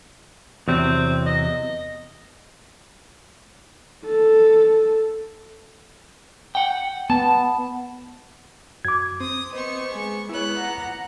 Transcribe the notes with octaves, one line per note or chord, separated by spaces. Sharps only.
E2 C3 F#3 C4
D#5
A4
F#5 G5
B3 A5
F#2 D6 G#6
C4 D#6
B3 C4 C5 D#5 C#6
G#3 G#5
G#3 B3 E4 C#5 F#6
F#5 A#5